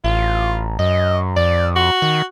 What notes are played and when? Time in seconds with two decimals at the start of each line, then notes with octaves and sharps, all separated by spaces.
0.04 A1 F4
0.79 F#2 D#5
1.36 F2 D5
1.76 F#4
2.02 D#3